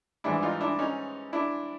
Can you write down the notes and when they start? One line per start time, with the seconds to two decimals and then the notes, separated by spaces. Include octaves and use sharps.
0.24 G#2 E3 G3 D4 E4
0.42 D#4 F4
0.61 D4 E4
0.79 C#4 D#4
1.33 D4 E4